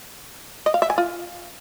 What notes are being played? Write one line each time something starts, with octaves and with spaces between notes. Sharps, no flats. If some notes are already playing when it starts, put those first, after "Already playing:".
D#5
F5
E5
G#5
F4